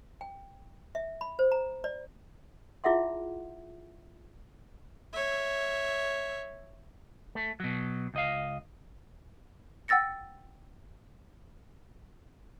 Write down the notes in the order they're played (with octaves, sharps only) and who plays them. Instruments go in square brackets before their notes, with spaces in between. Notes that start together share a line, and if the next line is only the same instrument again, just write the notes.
[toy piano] G5
E5
B5
C5
A#5
D5
E4 F4 G#4 E5 F#5 C6
[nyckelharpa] C#5 E5
[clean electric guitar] A3
B2 F#3
C#2 D#5 F5
[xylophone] F#5 G5 E6 A6 A#6 C#7